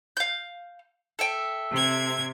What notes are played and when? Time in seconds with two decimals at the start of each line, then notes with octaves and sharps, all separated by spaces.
0.17 F5 G6
1.19 A4 E5 G5
1.71 C3 G#6